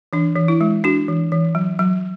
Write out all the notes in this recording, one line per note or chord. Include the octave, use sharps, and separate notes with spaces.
E3 D4
E3
E4
G#3
D4 F#4
E3
E3
F#3
F#3